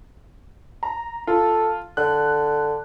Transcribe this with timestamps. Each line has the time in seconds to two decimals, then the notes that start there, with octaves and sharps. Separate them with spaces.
0.83 A#5
1.27 F4 A4
1.97 D3 F#6